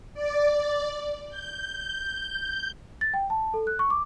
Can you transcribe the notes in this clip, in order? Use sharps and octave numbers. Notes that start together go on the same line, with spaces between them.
D5
G6
A6
G5
A5
A4
F#6
C#6
D6